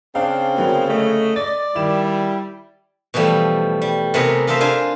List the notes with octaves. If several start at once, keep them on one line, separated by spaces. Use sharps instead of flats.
C#3 C4 D4 F5
D3 F#3 A#3 B3
A3 D#5
D5 A6
D#3 G3 E4 E7
B2 E3 F3 G3 A3
G3
C3 A3 B3 D#4 G#4 A#4
F4 A4 A#4 C5 E5 F5
D4 F4 C5 G#5